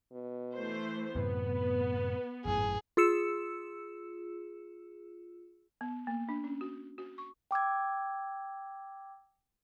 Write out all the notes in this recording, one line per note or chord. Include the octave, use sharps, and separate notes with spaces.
B2
E3 A3 C5
F#2 A2 C3 B3 B4
G#1 F#2 A2 G#4
F4 G#4 E6 C#7 E7
B3
A#3
D4
C#4
F#4
F#4
C#6
G5 D6 E6 G#6